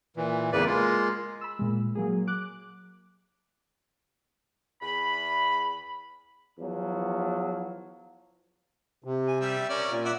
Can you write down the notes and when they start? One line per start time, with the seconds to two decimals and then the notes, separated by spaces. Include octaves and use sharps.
0.16 A#2 E3
0.52 E2 A2 C#3 A#3 B4 D5
0.66 G#3 A#3 F4
1.41 B5 E6
1.59 A#2 G#3
1.95 F#3 A#3 G#4
2.27 D6 F#6
4.82 E2 B5
6.59 E2 F3 F#3
9.04 C3
9.28 G#5
9.40 G3 E5
9.69 C#4 A#4 D5
9.89 A#2
10.05 D5 E5 F#5